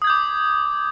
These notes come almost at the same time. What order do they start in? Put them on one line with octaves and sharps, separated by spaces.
D#6 G#6 G6 D6